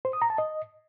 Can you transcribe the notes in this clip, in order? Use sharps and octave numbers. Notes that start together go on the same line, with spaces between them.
C5
D#6
A#5
A5
D#5